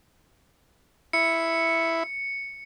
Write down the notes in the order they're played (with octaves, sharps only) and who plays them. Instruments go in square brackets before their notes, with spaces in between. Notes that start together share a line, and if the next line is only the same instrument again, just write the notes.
[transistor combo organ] E4 [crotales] C#7